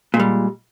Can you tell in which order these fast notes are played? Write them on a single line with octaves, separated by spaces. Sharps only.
A#2 G#3 G3